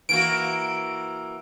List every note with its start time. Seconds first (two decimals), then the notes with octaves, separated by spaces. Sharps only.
0.09 E3 A#3 F#4 D7